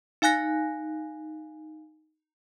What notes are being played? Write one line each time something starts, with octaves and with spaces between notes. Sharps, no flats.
D#4 F5 G#5 F#6 A#6